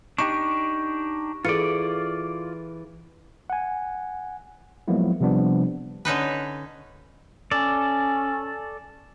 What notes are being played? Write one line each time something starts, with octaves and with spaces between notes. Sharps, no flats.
D4 D#4 G4 C#6
E3 F4 G#4 A4 D5 C#7
F#5 G#5
F3 F#3 G#3 A#3 B3 E4
C3 F3 G3 B3 D4
D3 C#4 D#4 B4
C#4 A4 D5